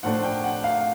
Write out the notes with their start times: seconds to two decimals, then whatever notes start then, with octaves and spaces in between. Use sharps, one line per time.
0.03 A2 F3 A3 D4 F#5
0.23 G5
0.44 F#5
0.64 F5